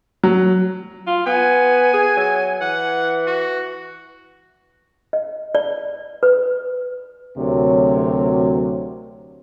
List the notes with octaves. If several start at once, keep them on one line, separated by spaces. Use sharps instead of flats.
F#3
F4
B3 G#5
G#4
F#3
E3 F#5
F#4
D#5
D5
B4
D2 C3 F#3 A#4 C#5